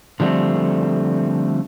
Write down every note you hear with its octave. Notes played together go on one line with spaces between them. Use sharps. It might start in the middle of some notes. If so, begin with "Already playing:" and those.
D3 F3 G3 A3 C4